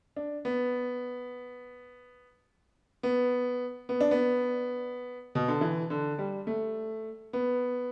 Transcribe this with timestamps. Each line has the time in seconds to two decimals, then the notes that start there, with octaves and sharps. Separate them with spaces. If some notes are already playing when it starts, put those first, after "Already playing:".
0.16 D4
0.45 B3
3.03 B3
3.89 B3
4.01 D4
4.11 B3
5.35 B2
5.48 D3
5.61 E3
5.90 D3
6.19 G3
6.47 A3
7.33 B3